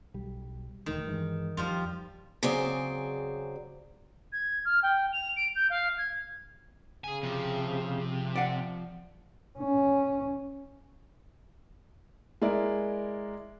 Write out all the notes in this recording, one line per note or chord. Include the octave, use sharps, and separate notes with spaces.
B1 G3
E1 D2 D#3 A3
G2 E3 G#3
F2 F3 G3 F4
C#3 F#3 C4 G#4 C5 D5
G#6
F6
G5
F7
D7
G6
F5
G#6
C#3 G#4 G#5
C3 F3
D5 F#5
C#4
G#3 E4 A#4 D5